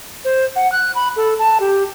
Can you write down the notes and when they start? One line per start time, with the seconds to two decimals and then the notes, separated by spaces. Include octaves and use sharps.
0.24 C5
0.56 F#5
0.72 F#6
0.95 B5
1.16 A4
1.39 A5
1.60 G4